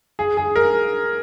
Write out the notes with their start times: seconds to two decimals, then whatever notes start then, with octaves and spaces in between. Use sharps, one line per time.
0.19 G#4
0.37 G#4
0.56 A#4